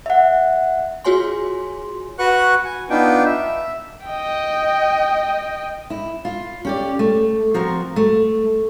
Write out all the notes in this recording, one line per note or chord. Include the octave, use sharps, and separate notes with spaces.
E5 F#5
F4 F#4 G#4 C#5 G#5 C6
F#4 B4 F#5 C#6 F#6
G#5
B3 D4 D#4 F4 G5
E5
D#5 G5
E4
F4
C#4 G4 D5
A3
F3 C4 F#4 A#4
A3